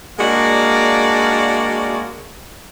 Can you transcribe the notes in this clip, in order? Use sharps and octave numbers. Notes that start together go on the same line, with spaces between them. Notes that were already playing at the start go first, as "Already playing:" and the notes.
G#3 A#3 D4 F#4 D5 F5